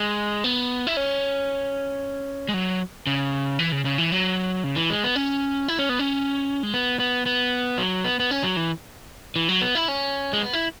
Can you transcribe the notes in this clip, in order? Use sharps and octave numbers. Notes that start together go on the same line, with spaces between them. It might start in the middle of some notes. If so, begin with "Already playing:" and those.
Already playing: G#3
B3
E4
C#4
G#3
F#3
C#3
E3
C#3
C#3
E3
F#3
C#3
E3
G#3
B3
C#4
E4
C#4
B3
C#4
G#3
B3
B3
B3
F#3
B3
B3
C#4
F#3
E3
E3
F#3
B3
E4
C#4
G#3
B3
E4